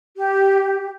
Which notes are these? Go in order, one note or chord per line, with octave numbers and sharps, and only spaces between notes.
G4